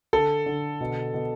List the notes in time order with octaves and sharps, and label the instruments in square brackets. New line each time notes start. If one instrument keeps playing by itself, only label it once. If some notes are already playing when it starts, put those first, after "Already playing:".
[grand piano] D3 A4
D3
B2
B2